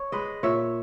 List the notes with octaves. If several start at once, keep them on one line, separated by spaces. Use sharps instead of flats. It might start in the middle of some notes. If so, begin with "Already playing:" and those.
Already playing: C#5
G#3 B4 D#5
A#2 C#5 E5